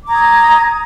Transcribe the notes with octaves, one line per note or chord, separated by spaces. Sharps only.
A#5 D6 D#6 G#6